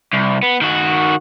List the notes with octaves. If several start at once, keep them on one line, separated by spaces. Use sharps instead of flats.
C2
B3
D#3 F#4